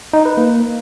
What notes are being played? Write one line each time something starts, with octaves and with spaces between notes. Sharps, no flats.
D#4
B4
A#3